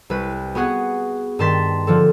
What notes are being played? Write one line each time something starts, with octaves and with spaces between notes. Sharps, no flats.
C2 B4
B3 F#4 G#4 F#5
G2 D#3 A5 C6 A6 B6
D3 F3 A4